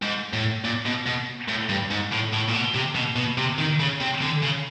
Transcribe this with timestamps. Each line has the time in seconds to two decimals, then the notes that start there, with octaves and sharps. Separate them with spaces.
0.02 G#2
0.33 A2
0.65 A#2
0.86 B2
1.07 B2
1.49 A2
1.69 G2
1.90 G#2
2.12 A2
2.33 A2
2.48 A#2
2.54 B2
2.75 C3
2.95 B2
3.16 B2
3.38 C3
3.58 D#3
3.80 C#3
4.00 C3
4.22 D3
4.42 C#3